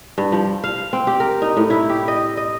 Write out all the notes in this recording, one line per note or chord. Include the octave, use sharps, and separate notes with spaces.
G2
F3
F5
C4
G4
A#4
D#4
A2
E4
G4
D#5
D#5